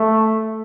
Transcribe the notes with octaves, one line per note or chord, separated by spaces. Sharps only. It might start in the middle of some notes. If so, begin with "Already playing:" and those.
Already playing: A3